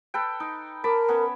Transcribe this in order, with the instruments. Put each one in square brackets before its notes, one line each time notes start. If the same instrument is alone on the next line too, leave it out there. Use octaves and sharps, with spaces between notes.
[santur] A4 B4 G5
D#4
[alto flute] A#4 [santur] A5 B5 D6
[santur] B3 C#4